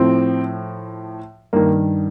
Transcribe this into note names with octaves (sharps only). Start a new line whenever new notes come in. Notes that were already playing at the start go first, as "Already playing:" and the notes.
Already playing: A2 F3 C4
G2 D#3 A#3